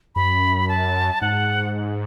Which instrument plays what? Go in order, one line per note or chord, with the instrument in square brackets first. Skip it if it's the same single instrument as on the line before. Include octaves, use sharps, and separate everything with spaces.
[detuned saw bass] F#2 [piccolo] B5
[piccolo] A5
[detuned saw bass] G#2 [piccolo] F#5